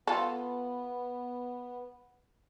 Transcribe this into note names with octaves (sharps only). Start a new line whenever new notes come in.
B3 F4 A4